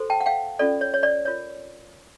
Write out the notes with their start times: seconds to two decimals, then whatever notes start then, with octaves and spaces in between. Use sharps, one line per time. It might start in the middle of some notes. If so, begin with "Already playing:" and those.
Already playing: F#4 A4 C5
0.10 G5 A5
0.20 F#5
0.26 F5 G5
0.59 C#4 F4 A4 D5
0.81 C#5
0.94 C#5
1.03 D5
1.25 F4 A#4 C#5